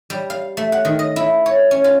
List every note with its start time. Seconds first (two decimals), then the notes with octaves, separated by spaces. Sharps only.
0.10 G3
0.30 F5
0.57 A3
0.72 F#5
0.85 D#3
0.99 D#5
1.16 E4
1.46 C#5
1.71 C#4
1.84 F4